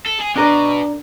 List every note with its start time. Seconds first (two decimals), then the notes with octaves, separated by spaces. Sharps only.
0.06 A4
0.20 G#4
0.35 B2 D4 A#4 D5